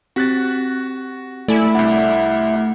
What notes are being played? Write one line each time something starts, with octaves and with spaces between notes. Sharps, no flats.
C4 F#4 G4 F#6 A6 B6
A3 E4 D5 G#5
C2 D4 F#5